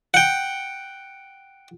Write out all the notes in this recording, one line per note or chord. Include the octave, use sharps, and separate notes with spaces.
F#5 G5